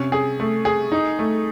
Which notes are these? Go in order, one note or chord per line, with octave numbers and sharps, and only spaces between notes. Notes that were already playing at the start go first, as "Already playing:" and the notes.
Already playing: C3 C#4
G#4
A3
G#4
D#4
A3